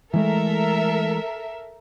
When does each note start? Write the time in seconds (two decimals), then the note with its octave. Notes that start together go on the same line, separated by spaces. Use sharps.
0.14 E3 G#3 A3 A4 A#4 E5